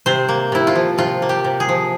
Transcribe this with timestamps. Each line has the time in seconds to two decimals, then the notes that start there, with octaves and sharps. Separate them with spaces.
0.06 C3 C5
0.28 A#3
0.52 C3 E4
0.67 F4
0.75 F3
0.98 C3 F4
1.22 A#3
1.29 G4
1.44 C3
1.60 G#4
1.69 F3